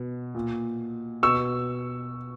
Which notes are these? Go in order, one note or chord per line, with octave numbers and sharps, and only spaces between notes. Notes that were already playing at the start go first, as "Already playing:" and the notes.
Already playing: B2
A#2
B2 C#6 E6